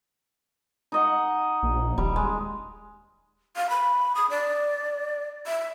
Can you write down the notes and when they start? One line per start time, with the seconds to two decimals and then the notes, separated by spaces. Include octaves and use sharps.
0.92 D#4 D#5 F#5
1.63 A#1
1.98 D#1 G3
2.16 G#3
3.56 F5
3.70 B5
4.15 D#6
4.30 D5
5.47 E5